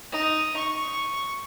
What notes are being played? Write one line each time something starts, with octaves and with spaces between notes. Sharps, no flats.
D#4
C#6